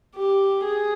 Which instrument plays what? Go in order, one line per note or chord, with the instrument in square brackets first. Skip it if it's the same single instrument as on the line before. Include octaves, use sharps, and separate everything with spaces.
[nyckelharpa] G4
G#4